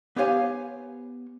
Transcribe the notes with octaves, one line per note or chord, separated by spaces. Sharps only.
B3 G4 C5 C#5 F5 G#5